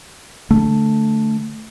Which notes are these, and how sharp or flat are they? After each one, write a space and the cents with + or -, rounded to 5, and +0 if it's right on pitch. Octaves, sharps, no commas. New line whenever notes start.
D3 +0 A3 +0